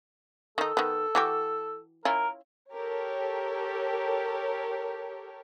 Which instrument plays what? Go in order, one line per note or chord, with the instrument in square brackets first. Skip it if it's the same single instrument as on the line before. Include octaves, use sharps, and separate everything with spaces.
[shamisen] D#3 D#4 [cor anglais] A4
[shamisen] D#3 B3
E3 F#4 G4
[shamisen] C#4 E4 F4 [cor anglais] A#4
[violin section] G4 A4 A#4 C#5